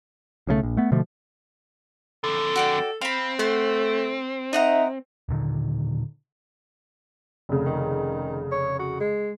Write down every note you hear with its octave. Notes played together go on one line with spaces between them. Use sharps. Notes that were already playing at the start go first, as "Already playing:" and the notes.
B1 C#3 E3 A3
A#1
A3 B3
B2 D3 F3 A3
F2 D3 A4
F#4 D5 G5
C4 F5 B5
A3 C5 F#5
D#4 D#5 E5 F#5 A#5
D#1 A#2 D3 D#3
F1 C#3
D#3
C#5
F#4
G#3